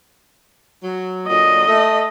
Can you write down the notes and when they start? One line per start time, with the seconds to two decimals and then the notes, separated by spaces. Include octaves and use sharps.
0.83 F#3
1.28 A#2 D3 F#3 D#5
1.67 A3